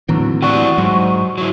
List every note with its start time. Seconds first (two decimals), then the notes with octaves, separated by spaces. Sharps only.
0.09 D#2 A2 D3 E3 F#3 C4
0.42 E4 F#4 G4 D5 C#6
0.78 G#2 F#3
1.38 F#3 E4